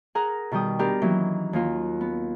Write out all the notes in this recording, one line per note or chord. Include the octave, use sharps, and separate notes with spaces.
G#4 A#4 F#5 A#5
B2 D#3 G3 G5 D#6
B3 D4 G4 A#4
D#3 E3 F#3 A#3 C#4
D#2 A#3 F4
B3